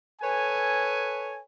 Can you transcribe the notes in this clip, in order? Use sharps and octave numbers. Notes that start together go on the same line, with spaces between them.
A4 B4 C#5 G#5